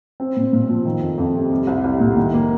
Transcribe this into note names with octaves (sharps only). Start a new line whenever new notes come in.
C4
A#2
A#2
F3
D#3
F2
F2
C3
G3
C2
C2
A#2
D#3
A#3